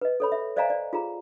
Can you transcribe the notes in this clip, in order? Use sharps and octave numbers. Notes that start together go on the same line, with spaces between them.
B4 D#5
A4 C#5 B5
E5
C5 D5 D#5 F5 G#5 A#5
D5
F4 G#4 A#5